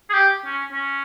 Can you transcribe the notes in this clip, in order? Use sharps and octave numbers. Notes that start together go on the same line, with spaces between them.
G#4
G4
C#4
C#4